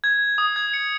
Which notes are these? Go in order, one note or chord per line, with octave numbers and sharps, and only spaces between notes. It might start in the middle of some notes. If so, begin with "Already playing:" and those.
G#6
D#6
G#6
C#7